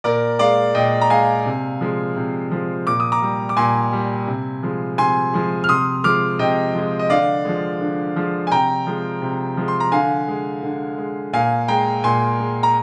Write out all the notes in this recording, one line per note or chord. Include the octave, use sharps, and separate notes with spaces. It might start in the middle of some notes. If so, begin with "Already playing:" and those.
A#2 A#4 D5
G#3 D5 F5
A#2 D#5 G5
A#5
G#3 F5 G#5
C3
F3 G#3
C3
F3 G#3
A#2 D6
D#6
A#5 D6
G3
D6
A#2 G#5 C6
G3
C3
F3 G#3
C3 G#5 C6
F3 G#3
F6
C3 C6 D#6
F3 G#3 D6 F6
C3 D#5 G5
F3 G#3
D#5
D3 D5 F5
F3 G#3
D3
F3 G#3
G#5
C3 G5 A#5
F3 G#3
C3
F3 G#3
C6
A#5
D3 F5 G#5
G#3
D3
G#3
A#2 F5 G#5
G#3 G5 A#5
A#2 G#5 C6
G#3
A#5